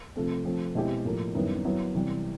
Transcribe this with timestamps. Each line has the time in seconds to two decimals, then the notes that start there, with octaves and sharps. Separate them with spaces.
0.16 C3 F3 A3 C4
0.45 F3 A3 C4
0.75 B2 G#3 C4 E4 G4
1.05 A2 F3 A#3
1.35 F#2 D#3 G3 B3 E4
1.65 F#3 B3 E4
1.95 C3 E3 G3